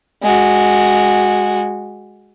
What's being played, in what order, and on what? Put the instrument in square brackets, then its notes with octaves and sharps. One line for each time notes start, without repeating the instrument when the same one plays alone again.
[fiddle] G#3 F#4